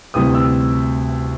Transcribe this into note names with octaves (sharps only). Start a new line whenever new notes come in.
D2 C3 E3 G3 C4 D#6
E6